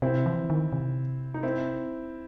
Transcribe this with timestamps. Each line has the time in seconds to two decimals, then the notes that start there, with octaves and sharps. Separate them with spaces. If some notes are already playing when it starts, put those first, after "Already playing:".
0.02 C3 C4 E4
0.26 E3
0.50 D#3
0.72 C3
1.34 D#4
1.43 C4 E4